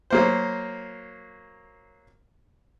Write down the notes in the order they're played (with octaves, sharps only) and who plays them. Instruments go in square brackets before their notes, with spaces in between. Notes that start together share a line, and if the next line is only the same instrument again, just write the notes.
[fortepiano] F#3 A#3 C5